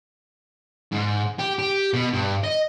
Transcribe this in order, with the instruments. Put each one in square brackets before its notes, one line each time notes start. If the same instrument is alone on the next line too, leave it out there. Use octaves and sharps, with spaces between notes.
[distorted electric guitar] G#2
G4
G4
B2
G2
D#5